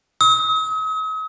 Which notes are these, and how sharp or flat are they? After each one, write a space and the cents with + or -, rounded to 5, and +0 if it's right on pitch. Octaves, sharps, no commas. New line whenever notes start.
D#6 +45